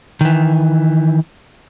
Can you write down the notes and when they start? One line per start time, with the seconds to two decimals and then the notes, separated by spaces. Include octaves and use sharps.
0.21 D#3 E3